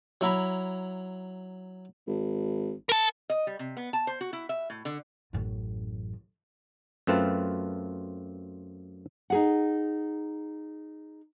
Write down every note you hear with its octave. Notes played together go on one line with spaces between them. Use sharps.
F#3 E4 A#5 B5
G#1
A#4 A5
D#5
G3
C3
B3
A5
C5
F#4
E4
E5
A2
D3
A1 F#2
F#2 A3 C4 F4 B4 A5
D#4 G#4 F#5